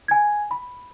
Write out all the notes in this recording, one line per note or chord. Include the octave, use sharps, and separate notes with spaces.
G#5 G#6
B5